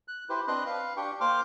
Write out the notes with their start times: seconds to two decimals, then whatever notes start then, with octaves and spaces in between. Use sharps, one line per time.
0.08 F#6
0.29 E4 G4 B4 C5
0.48 C4 D4 B4 D#5 C6 F#6
0.66 B4 F5
0.97 D4 G4 G5 C#6
1.21 A#3 C5 G5 C6 D6 F6